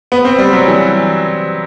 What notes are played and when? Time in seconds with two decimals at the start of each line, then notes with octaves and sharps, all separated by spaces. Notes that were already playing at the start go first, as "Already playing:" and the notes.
0.12 B3
0.25 C4
0.38 G3
0.53 F#3
0.67 E3